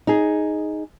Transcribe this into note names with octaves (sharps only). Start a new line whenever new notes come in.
D#4 G#4